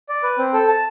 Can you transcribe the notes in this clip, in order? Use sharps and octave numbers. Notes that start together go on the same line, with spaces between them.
D5
B4
C4
A4
A5